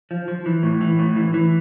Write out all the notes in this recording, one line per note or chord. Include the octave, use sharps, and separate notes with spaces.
F3
F3
E3
A2
E3
A2
E3
E3